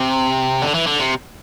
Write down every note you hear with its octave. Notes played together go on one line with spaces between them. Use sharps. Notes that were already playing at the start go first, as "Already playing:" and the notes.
Already playing: C3
D3
E3
D3
C3